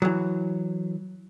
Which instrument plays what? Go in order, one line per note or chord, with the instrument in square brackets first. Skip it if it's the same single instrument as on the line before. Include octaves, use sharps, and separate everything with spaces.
[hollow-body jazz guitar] E3 F#3